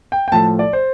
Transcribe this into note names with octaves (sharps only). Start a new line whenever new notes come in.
G5
G5
A2 F3 A3 A5
D5
C5